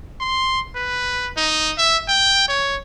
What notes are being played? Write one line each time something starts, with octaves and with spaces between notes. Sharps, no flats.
C6
B4
D#4
E5
G5
C#5